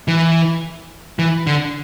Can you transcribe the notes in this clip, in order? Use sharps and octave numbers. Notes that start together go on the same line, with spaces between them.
E3
E3
D3